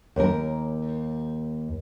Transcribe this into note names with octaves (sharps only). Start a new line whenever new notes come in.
D#2 A#4